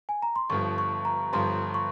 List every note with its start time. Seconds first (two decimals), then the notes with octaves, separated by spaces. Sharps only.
0.09 G#5
0.22 A#5
0.36 C6
0.50 G1 G2 F3 C#6
0.78 C#6
1.05 A#5
1.33 G1 G2 F3 C6
1.74 C#6